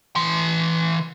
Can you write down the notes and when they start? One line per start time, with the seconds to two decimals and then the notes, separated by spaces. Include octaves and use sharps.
0.16 E3 C6